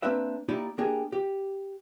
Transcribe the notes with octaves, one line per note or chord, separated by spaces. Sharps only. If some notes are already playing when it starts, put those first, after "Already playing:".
A#3 C4 D4 B4 E5
A#3 D#4 E4 G4 D5
A#3 D4 G4 G#4 A#4
G4